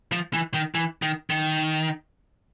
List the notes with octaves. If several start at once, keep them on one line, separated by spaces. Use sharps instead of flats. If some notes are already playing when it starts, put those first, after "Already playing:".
F3
E3
D#3
E3
D#3
D#3